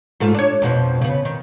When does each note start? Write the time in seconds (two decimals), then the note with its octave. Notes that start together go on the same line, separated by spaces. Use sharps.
0.20 G#2 A3 F4
0.34 D4 C#5
0.62 F2 B2 F3
1.01 C#3 B3
1.25 D#3